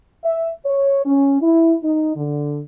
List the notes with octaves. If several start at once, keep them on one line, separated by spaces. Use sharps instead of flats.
E5
C#5
C#4
E4
D#4
D3